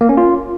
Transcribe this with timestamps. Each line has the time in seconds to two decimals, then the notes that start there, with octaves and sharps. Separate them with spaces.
0.01 A#3
0.09 C#4
0.17 F4